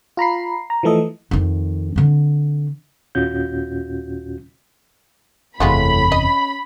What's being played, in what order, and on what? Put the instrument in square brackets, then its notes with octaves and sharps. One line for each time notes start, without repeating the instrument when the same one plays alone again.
[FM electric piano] F4 A#5 B5 C7
A#5
E3 F3 A3 A4 D#5
[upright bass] F2 D#3
D3 C4
[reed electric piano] D#2 A#2 C#4 F4 F#4 G6
[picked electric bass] F#1 E2 C3 [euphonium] A2 [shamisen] G#3 F4 F#4 [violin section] B5
[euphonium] C#4 [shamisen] D#5